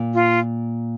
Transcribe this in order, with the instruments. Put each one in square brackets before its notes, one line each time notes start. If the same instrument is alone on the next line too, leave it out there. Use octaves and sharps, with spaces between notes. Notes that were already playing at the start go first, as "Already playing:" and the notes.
Already playing: [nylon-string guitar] A#2
[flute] F4